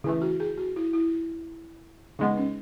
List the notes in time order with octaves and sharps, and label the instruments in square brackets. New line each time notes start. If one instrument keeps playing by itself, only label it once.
[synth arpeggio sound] C#3 E3 A3 [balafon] E4
[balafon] F#4
G#4
F#4
E4
E4
[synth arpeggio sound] C#3 G#3 B3 [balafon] D#4
[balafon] C#4